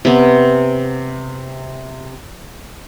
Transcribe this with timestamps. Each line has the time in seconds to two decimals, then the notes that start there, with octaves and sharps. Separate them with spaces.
0.05 C3 B3